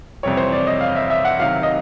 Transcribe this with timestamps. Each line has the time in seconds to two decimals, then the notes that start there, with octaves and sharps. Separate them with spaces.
0.23 F2 C3 E3 G3 C4 C#5
0.37 C5
0.52 D5
0.67 D#5
0.80 F5
0.96 E5
1.10 E5
1.25 F#5
1.39 C3 D#3 F#3 F5
1.63 D#5